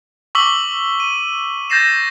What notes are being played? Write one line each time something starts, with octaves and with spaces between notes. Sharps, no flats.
C#6 D6 E6 B6 F#7 G7
D#7
G6 A6 A#6 C7 E7